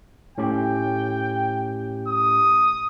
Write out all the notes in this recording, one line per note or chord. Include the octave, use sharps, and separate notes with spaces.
A2 C#4 G4 G5
D#6